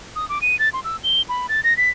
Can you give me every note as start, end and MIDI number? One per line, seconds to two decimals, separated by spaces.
0.16 0.27 87
0.29 0.41 86
0.42 0.58 99
0.59 0.69 93
0.73 0.80 84
0.84 0.97 88
1.03 1.22 103
1.29 1.47 83
1.49 1.61 93
1.64 1.76 94
1.77 1.90 95